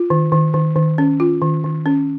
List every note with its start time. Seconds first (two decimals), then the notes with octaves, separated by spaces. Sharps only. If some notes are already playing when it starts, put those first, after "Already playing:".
Already playing: F4
0.10 D#3
0.32 D#3
0.54 D#3
0.76 D#3
0.98 C#4
1.20 F4
1.42 D#3
1.64 D#3
1.86 C#4